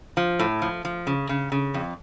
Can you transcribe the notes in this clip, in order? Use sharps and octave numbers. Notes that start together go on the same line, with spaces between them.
F3
A2
F3
F3
C#3
C#3
C#3
F2